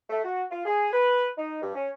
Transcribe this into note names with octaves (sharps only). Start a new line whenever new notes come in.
A3
F#4
F4
G#4
B4
D#4
G2
C#4